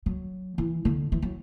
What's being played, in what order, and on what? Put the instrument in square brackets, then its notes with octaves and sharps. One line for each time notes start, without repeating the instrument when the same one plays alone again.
[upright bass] F#3
E3
D3
E3
F#3